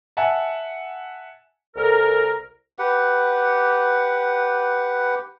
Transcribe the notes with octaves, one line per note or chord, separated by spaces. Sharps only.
E5 F#5 G#5 A5
C2 A4 A#4
G4 B4 F#5